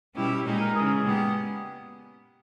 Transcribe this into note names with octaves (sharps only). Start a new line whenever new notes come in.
B2 G3 C#4 E4 G4
A#2 G#3 D#4 G#4
A#4
C#3 E3 G#3 G#4
A#2 G#3 B3 G4